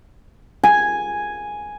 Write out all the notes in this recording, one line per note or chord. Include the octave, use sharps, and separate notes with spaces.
G#5